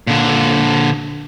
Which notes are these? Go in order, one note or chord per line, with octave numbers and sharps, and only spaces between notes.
A#2 D3